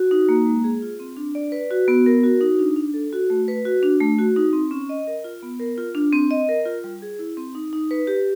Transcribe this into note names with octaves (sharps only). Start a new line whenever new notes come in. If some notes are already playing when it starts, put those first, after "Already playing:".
Already playing: F#4
D#4
A#3
G#3
G#4
F4
C4
D4
D5
B4
F#4
B3
A#4
F#4
D#4
D4
D4
A4
F#4
A3
B4
F#4
D4
A3
F#4
D#4
C4
C#4
D#5
A#4
F4
B3
A#4
F4
D4
C4
D#5
A#4
F4
G3
G#4
E4
C4
D#4
D#4
B4
G4